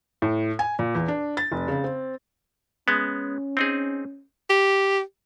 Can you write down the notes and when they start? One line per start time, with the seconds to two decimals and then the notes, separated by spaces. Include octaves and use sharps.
0.22 A2
0.59 G#5
0.79 A#2
0.95 E2
1.08 D4
1.37 A6
1.52 F1
1.68 C#3
1.84 C4
2.88 G#3 B3 C#4
3.57 C4 D#4 G#4
4.50 G4